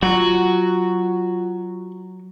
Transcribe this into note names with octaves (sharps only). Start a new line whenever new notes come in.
F#3 F4 F#4